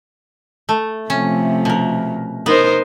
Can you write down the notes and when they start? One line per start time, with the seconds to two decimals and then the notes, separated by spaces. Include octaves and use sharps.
0.69 A3
1.10 C3 F3 A3 C#4
1.65 B2 A#4
2.46 B3 D#4 A#4 C5